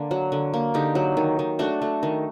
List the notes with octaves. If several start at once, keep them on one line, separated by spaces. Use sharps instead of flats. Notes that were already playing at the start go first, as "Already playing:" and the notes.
Already playing: D3 A#3 D4
F#3
D3
A#3
D3 D#4 G4
F#3
D#3
D#3
A3 D4 F#4
A3
D#3